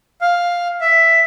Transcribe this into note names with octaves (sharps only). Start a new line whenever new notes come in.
F5
E5